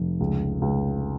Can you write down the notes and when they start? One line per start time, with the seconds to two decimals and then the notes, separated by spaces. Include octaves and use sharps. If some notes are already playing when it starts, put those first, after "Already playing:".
Already playing: F1
0.20 C#2
0.62 C#2